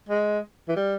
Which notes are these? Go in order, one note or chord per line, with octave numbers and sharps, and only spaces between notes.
G#3
E3
G3